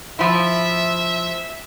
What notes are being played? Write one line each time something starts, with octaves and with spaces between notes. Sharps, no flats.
F3 E4 E5